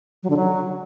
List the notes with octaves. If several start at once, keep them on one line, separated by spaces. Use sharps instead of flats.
F#3
D3
F#3